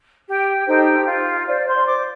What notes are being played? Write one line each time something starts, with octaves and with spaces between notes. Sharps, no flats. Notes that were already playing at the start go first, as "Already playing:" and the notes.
G4 G5
D#4 G4 A4 C5 G5
F4 F5
F4 C5 D5
C5 C6
D5 D6